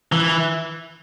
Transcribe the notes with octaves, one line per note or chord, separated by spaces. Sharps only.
E3